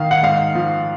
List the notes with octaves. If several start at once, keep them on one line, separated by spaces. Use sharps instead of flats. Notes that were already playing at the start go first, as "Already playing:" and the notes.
Already playing: D#3 F5
F#5
G#2 F5
F3